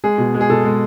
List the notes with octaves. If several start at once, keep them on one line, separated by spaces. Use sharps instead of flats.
G#3 G#4
B2
G#3
G#4
B2 A4
G#3